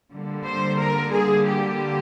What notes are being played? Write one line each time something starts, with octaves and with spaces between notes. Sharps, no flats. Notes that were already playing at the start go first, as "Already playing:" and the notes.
D3 G3 A#3
C5
A#4
G#4
G4